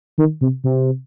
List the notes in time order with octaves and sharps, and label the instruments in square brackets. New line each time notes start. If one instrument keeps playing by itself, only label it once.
[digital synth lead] D#3
C3
C3